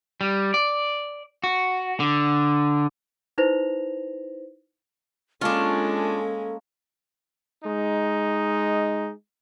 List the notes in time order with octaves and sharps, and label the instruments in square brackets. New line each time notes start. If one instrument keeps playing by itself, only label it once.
[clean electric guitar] G3
D5
F#4
D3
[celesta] D#4 E4 B4 C5 A#6 F7
[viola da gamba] G#3 C#4 [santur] A#3 A5 C#6 [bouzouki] D4 F4 [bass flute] A4
[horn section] G#3 D#4